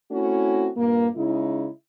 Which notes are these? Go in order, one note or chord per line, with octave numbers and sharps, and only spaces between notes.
A3 C4 C#4 E4 F#4
G2 A#2 A#3
C#3 G#3 D#4 E4